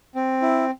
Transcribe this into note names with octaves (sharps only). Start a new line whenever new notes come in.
C4
E4